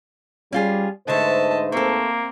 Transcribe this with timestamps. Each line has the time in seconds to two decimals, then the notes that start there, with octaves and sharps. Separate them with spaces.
0.52 G3 C#4 F4 G#4
1.08 G#2 D3 A3 B4 C5 D#5 E5 A5
1.72 A3 A#3 C4 A4